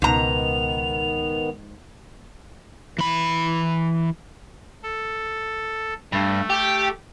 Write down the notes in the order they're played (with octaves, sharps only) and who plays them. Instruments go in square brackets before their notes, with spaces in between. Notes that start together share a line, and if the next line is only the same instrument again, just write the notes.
[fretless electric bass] C#2 B2 [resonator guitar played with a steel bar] G#2 A#5 [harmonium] D#3 B3 [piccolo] F7
[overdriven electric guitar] E3 B5
[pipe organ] A4
[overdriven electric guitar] G2 [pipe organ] A3
[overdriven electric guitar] G4